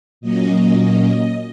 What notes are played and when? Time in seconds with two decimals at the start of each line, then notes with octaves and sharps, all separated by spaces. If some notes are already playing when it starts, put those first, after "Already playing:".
0.21 A#2 F#3 A#3 C#4 D#5
0.76 D#5